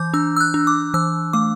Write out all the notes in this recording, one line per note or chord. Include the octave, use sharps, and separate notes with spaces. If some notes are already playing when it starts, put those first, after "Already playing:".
Already playing: E3 D6 G6
D4 E6
E6
F#6
D4
D6
E3 E6
A3 D6